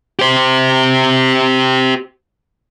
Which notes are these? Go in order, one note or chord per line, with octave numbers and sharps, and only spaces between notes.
G4 C5